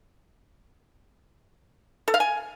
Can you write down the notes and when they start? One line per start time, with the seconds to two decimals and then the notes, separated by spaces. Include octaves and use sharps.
2.08 A4
2.14 F5
2.20 G#5